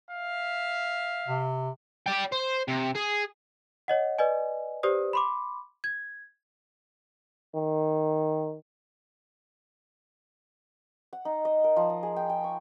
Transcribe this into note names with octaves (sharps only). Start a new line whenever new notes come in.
E5 F5
C3
D5 G5
C5
C3
G#4
C#5 D#5 F#5
B4 D5 D#5 G#5
G4 B4 C5 D5 D#6
B5 C6 D6
G#6
D#3
F#5
D#4
D#5
A#4
F3
D#5
G#4
G5
G5
C#6